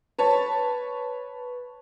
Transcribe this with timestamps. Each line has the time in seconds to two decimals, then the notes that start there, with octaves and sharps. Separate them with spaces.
0.18 B4 C#5 A5